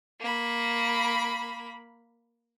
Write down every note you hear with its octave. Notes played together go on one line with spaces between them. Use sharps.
A#3 B5